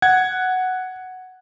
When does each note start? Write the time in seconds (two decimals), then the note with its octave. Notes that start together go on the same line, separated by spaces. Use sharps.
0.02 F#5 G#6